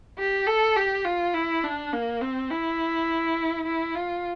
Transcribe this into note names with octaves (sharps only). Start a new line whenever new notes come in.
G4
A4
G4
F4
E4
D4
A#3
C4
E4
E4
F4